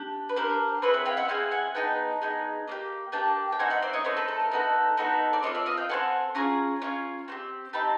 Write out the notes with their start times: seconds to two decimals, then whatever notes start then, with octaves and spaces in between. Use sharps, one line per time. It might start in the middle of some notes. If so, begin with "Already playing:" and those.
Already playing: D4 G4
0.29 B4
0.36 D4 G4 A#4 C5
0.82 C4 E4 G#4 B4 C#5
0.94 E5 F#5
1.06 F5 G5
1.17 E5 F#5
1.28 C4 E4 G#4 F5 G5
1.51 F#5 G#5
1.75 B3 D#4 G#4 G5 A5
2.21 B3 D#4 G#4
2.68 A#3 D4 G4
3.12 A#3 D4 G4 G5 A5
3.52 G5
3.59 A3 C4 D#4 F#5 G#5
3.70 E5 F#5
3.82 C5 D5
3.93 C#5 D#5
4.04 A3 C4 D#4 A#4 C5
4.17 A4 B4
4.28 A4
4.40 A#4
4.51 B3 D#4 F#4 A4
4.97 B3 D#4 F#4 A4
5.33 D5
5.43 C4 F4 A4 C#5 D#5
5.55 D5 E5
5.66 D#5 F5
5.77 F5 G5
5.89 C4 F4 A4 F#5 G#5
6.35 C#4 F4 G#4 G#5 A#5
6.82 C#4 F4 G#4
7.28 C4 D#4 G4
7.73 C4 D#4 G4 A5 B5